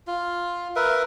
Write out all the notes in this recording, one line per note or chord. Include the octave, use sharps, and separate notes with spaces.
F4
A#4 B4 E5